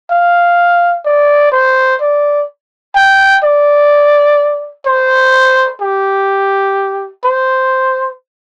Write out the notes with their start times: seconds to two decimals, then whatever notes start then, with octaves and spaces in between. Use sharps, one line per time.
0.11 F5
1.05 D5
1.52 C5
2.01 D5
2.96 G5
3.44 D5
4.86 C5
5.81 G4
7.25 C5